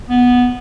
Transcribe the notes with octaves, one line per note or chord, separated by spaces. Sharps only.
B3